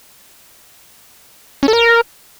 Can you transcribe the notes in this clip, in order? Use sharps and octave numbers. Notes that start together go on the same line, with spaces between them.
C#4
A4
A#4